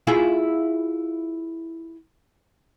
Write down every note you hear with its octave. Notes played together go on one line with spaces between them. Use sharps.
E4 F4 G#4